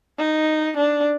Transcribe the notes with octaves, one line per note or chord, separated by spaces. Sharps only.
D#4
D4